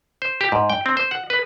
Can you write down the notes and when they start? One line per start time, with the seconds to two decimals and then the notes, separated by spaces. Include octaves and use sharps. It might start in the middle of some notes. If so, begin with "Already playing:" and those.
0.22 C5
0.41 G4
0.52 G#2
0.70 G5
0.86 C4
0.97 C5
1.11 F#5
1.30 B4